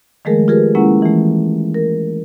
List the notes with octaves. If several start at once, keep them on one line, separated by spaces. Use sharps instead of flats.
D#3 F3 G#3 A3 G#4 A#4
F4 G4 G#4 A#4 B4
G#3 A#3 C#4 E4 G#4 F#5
E3 A3
A#4